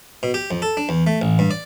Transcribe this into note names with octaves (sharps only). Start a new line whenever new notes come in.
B2
G4
F2
A4
D4
E2
A3
A1
G2
D5